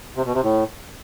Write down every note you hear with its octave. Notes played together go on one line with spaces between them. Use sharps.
C3
B2
C3
A2